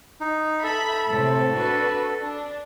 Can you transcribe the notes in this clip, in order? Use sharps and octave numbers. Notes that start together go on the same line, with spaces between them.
D#4
A4 E5 B5
A2 C3 C4 A4
D4 F#4 B4
D4